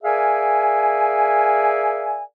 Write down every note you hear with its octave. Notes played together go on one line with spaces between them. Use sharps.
G#4 A#4 D5 E5 F5 G#5